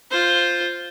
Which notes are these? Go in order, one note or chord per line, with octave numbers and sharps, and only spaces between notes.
F4 C5